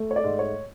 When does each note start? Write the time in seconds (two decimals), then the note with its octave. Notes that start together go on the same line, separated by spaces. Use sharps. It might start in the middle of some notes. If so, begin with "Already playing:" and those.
Already playing: A3
0.11 C#5
0.16 D5
0.24 G#2
0.39 C#5